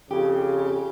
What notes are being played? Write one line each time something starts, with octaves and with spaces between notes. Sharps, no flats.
F2 C#3 G4